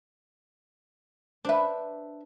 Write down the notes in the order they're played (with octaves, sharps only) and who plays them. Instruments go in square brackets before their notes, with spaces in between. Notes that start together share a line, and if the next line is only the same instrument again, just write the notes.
[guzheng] D4 B4 [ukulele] C5 E5